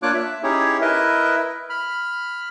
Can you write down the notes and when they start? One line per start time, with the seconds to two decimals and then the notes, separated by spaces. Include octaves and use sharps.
0.03 A#3 D4 F4 C#5 D6 F#6
0.14 E5
0.43 C#4 D#4 E4 G4 G#4 C#5
0.81 E4 A#4 B4 D#5 E5
1.70 B5 F6